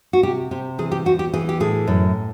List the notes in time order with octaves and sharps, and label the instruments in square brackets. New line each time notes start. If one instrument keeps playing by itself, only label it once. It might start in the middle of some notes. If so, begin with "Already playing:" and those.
[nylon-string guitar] F#4
C3 G4
C3 G4
E3 G#4
G4
E2 F#4
G4
E3 G#4
G4
A2 G#4
F#2